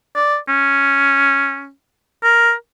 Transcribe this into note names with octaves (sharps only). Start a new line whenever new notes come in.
D5
C#4
A#4